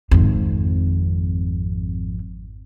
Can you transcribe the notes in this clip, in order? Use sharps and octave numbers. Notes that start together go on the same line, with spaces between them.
G#1 F2